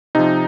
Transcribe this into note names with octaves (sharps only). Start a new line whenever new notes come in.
C3 F3 D#4